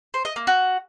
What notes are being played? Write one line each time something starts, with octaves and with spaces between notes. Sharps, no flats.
C5
D#5
A#3
F#4